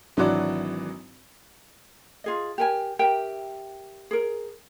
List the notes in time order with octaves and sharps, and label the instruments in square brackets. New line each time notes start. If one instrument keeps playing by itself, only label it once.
[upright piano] G#1 E3 F#3 D4 F#4 D5
[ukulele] F4 G#4 D#5
G4 A#4 G#5
G4 A#4 E5 G5
G#4 A#4